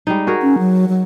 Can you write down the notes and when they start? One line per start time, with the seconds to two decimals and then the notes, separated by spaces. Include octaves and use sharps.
0.07 G3 G#3 D#4
0.27 F#4 G#4 A#4
0.42 C#4
0.59 F#3
0.88 F#3